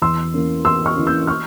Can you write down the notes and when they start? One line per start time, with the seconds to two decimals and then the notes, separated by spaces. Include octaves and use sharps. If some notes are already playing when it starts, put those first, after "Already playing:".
0.02 E2 C6 E6
0.34 E3 A#3 C#4
0.65 E2 C6 E6
0.86 C#6 F6
0.96 E3 A#3 C#4
1.07 E6 G6
1.27 C#6 F6